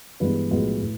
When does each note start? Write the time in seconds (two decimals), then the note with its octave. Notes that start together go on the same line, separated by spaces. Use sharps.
0.20 G2 E3 G#3 B3 B4
0.51 B1 A2 F3 G#3 B4
0.82 A2